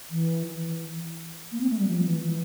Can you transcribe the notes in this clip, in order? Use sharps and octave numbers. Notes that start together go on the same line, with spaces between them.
E3
E3
A#3
C4
A3
G3
F3
E3
E3